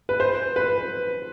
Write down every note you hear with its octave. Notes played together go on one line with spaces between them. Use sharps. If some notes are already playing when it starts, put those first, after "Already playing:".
B4
C5
B4